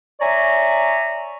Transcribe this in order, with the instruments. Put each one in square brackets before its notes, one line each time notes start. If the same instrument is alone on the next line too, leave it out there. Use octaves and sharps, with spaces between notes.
[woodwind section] C#5 D5 E5 G#5 A#5 C#6